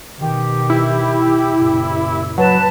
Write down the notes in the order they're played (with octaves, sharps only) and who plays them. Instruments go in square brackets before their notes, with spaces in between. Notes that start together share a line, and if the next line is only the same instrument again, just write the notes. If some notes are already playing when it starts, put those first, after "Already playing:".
[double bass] B2 D#3 [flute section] G4
[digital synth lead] E4
[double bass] F#1 A#2
[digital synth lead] F#3 [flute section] B4 A5